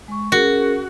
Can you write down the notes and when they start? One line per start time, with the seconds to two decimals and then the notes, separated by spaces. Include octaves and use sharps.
0.08 G#3 C#6
0.32 C#4 F#4 G#4 A#4